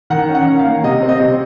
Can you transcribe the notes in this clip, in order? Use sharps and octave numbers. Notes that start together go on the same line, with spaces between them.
D#3 F#5
C#4
F#5
D#3
F5
A#3
C3 D#5
C4
D#5
C3